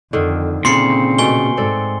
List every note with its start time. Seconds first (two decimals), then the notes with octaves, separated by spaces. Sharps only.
0.13 F2 D3 D#3
0.65 A#2 C#3 C4 C6 C7 C#7
1.19 B2 A3 G#5 G7
1.57 G#2 C4 A4 D5